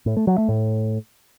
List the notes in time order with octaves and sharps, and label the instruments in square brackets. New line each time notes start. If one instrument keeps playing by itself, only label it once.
[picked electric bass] A2
A3
F#3
A3
A2